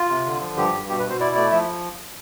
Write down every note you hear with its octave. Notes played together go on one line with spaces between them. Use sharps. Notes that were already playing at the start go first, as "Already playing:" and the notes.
Already playing: F4
C3
D3
F3
G2 G4
G2
B2 G4
B4
B2
C5
E4 D5
A3 D5
F3 E5